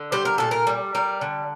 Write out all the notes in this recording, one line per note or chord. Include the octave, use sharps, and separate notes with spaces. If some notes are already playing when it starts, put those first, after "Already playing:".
Already playing: D3
G3 C5
A#4
A#2 A4
A#4
G3
G3 A#4
D3